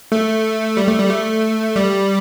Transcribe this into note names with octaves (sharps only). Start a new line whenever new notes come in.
A3
G3
A3
G3
A3
G3